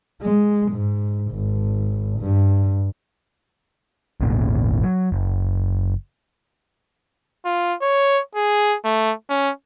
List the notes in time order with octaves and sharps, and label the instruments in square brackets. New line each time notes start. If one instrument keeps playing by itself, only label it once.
[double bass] G#3
G#2
G#1
G2
[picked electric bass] G#1 D#2 A#2 C#3
F#3
F#1
[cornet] F4
C#5
G#4
A3
C#4